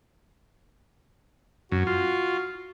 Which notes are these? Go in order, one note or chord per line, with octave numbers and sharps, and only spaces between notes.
F#2 F#4
F4